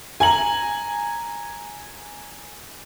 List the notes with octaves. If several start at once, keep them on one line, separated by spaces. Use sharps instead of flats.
G#5 A#5 F#7